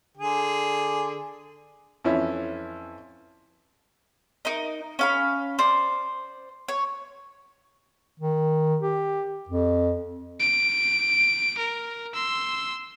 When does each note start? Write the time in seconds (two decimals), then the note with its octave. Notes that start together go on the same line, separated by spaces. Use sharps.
0.17 D3 G#4
2.04 F2 E3 C#4 E4
4.45 D#4 A#4 D#5
4.99 C#4 F5 B5
5.59 C5 D5
6.68 C#5
8.20 D#3
8.80 G4
9.49 F2
10.40 D7
11.58 A#4
12.14 C6 E6